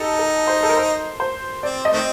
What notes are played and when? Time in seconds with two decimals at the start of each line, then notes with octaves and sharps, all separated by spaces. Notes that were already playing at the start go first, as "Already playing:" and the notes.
Already playing: D#4 G4 A4
0.19 A4
0.47 C5
0.63 A4
0.69 A#4
0.77 C5
1.20 C5
1.63 C4 D5
1.85 D#5
1.93 D#3 A3 C4